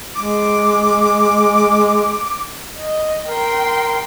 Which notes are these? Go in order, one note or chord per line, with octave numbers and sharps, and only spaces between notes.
G#3 D6
D#5
A#4 G5 C6